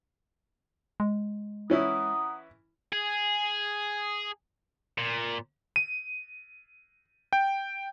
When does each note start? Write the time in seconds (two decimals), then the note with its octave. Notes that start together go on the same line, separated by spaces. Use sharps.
1.00 G#3
1.70 E3 C#4 E4 F#5 A#5 D#6
2.92 G#4
4.98 A#2
5.76 D#7
7.33 G5